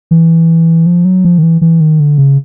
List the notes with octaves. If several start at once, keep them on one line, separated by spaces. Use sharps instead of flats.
E3
F3
F#3
F3
D#3
E3
E3
D#3
D3
C#3